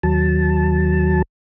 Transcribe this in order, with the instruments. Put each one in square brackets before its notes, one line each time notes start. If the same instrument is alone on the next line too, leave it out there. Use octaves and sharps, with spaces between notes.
[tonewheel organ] D#2 F#3 A5